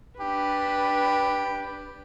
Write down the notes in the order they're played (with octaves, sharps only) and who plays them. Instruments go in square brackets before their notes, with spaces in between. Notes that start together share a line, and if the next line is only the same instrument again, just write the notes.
[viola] D4 B4 [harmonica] G4